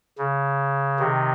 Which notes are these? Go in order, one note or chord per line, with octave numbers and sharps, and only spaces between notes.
C#3
C3 D#3